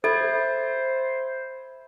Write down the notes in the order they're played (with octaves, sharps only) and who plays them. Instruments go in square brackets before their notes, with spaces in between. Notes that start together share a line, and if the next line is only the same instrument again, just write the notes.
[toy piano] A4 [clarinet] C5 [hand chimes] E5 G#6 [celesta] B5 A6